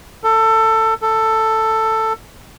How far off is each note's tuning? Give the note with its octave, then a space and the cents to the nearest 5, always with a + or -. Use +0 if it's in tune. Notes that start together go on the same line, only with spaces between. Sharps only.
A4 +20
A4 +10